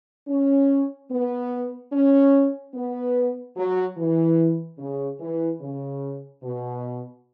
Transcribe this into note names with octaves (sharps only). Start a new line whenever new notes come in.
C#4
B3
C#4
B3
F#3
E3
C#3
E3
C#3
B2